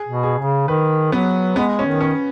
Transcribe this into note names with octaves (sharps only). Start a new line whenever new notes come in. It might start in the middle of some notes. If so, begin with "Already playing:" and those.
Already playing: G#4
B2
G#4
C#3
D#3 B4
F#3 B3
G#3 B3
C#4
D#3
C#4